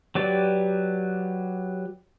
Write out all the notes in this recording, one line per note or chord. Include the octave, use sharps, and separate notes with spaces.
F#3 G4 B4 D5